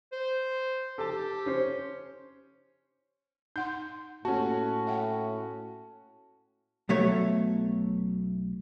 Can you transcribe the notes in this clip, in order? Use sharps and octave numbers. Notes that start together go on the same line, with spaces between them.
C5
G4 A4 A5
C#4 C5
D#4 F#5 C6 G6
A2 A#3 C#4 F#4 G4 A4 A5
E5 F#5 G5
B1 F#3 A3 C#5